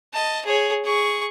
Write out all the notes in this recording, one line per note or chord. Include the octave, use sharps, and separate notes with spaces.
D#5 A5
G#4 C#5
G#4 C#6